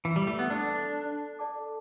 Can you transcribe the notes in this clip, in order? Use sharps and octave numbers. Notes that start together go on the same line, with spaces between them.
E3
G3
A3
B3
D4 A4 D5 A5 D6
A4 D5 A5 D6